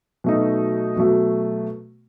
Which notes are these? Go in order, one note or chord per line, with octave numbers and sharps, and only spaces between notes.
B2 F#3 A3 D#4
B2 F#3 A3